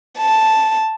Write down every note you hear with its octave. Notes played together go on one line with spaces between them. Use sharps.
A5